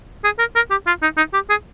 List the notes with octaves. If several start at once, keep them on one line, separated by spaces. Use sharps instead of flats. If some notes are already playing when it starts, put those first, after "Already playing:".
G#4
A#4
A#4
G4
F4
D#4
D#4
G4
G#4